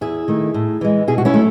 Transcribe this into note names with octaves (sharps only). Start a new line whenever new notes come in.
E2 E4 G#4
D#3 A3
A2
E3 G#3
B2 E4 G#4
F#4
C#4 E4
F#3 A3